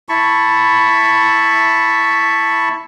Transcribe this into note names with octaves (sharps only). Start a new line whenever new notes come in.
E4 A5 B5 C#6